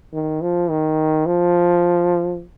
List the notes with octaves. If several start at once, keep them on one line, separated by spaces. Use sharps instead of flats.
D#3
F3
D#3
F3